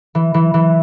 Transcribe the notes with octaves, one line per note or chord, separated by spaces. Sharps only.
E3
E3
E3